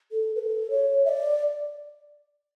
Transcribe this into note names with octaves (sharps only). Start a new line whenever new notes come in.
A4
B4
A4
C#5
E5
D5